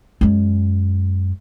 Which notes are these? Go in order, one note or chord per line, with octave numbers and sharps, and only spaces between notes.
F#2 G#3